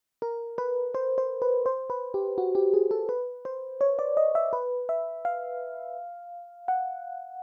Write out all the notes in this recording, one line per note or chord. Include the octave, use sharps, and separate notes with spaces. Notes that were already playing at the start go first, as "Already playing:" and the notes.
A#4
B4
C5
C5
B4
C5
B4
G4
F#4
G4
G#4
A4
B4
C5
C#5
D5
D#5
E5
B4
E5
F5
F#5